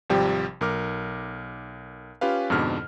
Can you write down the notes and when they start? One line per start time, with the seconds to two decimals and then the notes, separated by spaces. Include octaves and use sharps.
0.10 G#1 C3 F3 G3 G4 G5
0.61 B1 A#4 D6 F6
2.21 C#4 F4 G4 B4 F5
2.50 F2 G#2 B2 D3 F6